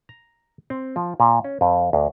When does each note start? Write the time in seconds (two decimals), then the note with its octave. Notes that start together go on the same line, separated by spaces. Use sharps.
0.09 A#5
0.70 C4
0.96 F3
1.20 A#2
1.44 C#4
1.61 F2
1.93 D2